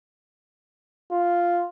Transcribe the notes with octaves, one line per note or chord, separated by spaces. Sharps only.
F4